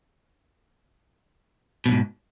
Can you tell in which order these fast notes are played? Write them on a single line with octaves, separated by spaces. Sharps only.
B2 F2 G#2